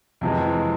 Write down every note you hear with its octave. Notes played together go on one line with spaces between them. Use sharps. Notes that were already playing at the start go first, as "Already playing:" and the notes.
F2 C3 E3 G#3